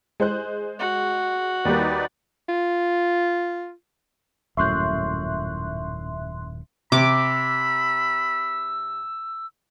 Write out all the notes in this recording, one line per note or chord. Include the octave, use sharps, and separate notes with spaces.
G#3 C5 F#6
F#4
D#2 G3 A#3 D#4 B4 D5
F4
D#1 F#2 A2 E5 C6 C#6 F#6 G6
C3 B5 D6 E6